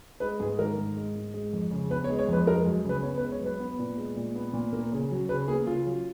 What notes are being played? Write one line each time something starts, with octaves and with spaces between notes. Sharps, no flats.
G#3 B4
G#2 G#4
D#3 A#4
G#2
G#3
G#2
G#3
F2
C#3
B3 B4
C#5
G#3
C#5
F2 B4
G#3 A#4
F#2
C#3 B4
B3 C#5
B4
G#3
C#5
F#2 B4
B3
A#2
G#3
A#2
B3
A#2
A#3
C#3
F#3
C#3 B4
A#3 G#4
C#3 F4
F#3